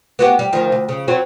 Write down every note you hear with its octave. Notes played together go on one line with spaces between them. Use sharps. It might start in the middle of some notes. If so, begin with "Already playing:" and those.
B3 F#4 G4
G3
D2 D#3 F3
D2
C#3
F#3 C4 C#5